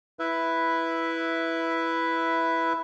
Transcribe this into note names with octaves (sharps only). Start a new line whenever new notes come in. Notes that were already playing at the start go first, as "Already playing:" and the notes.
E4 B4 E5